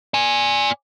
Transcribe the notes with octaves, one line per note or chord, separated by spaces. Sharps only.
D5 G#5